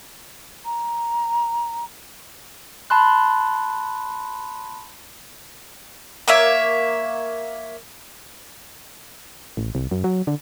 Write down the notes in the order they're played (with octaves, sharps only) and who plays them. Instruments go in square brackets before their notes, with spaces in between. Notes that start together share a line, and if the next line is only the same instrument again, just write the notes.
[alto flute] A#5
[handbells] A5 B5 C6 F#6
[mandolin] A#3 C#5 E5
[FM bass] A1
C2
F#2
F#3
D3